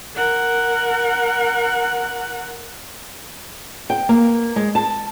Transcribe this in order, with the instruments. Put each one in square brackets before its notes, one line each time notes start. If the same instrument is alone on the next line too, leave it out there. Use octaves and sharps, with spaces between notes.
[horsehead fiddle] A#4 F#5
[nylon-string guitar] G5
A#3
G#3
A5